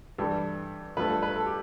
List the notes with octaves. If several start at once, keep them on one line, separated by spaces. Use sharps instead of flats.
G2 E3 G3 A4
G2 F3 A3 B4
A4
B4
A4
G4